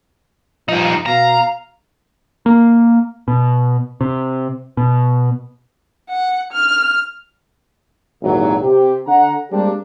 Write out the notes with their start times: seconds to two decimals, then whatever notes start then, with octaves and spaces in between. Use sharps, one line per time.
0.69 G2 F3 D#4
1.06 B2 F5 A#5
2.46 A#3
3.28 B2
4.01 C3
4.77 B2
6.10 F#5
6.53 F6
8.22 G#1 D#2 A#2 E3 F#3
8.62 C3 G4
9.07 D3 F#5 A#5
9.51 G3 G#3 A#3 C4 D4 G4